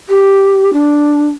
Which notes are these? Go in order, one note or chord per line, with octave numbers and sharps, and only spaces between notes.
G4
D4